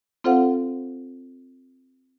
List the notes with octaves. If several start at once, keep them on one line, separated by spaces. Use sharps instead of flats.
C4 F4 A4 C5 F5 F#5